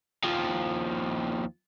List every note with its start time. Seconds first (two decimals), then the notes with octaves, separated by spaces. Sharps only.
0.24 D#2 F3